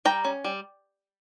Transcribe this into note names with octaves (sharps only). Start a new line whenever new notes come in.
G3 G5 A#5
C#4
G3